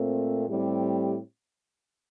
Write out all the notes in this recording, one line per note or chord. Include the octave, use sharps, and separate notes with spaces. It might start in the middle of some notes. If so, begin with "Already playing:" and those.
Already playing: A#2 A3 C4
A2 G3 C4 G4